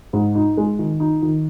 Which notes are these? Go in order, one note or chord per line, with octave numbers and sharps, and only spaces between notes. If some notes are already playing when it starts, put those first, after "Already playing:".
G#2
D#4
G#3
D#3
D#4
D#3